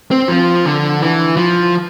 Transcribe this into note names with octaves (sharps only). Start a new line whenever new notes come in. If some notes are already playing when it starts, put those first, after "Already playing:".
C4
F3
D3
E3
F3